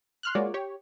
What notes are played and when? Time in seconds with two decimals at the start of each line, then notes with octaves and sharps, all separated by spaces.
0.23 C6 F6 F#6
0.35 G#3 A#3 F4 F#4 C#5 D5
0.54 G4 C#5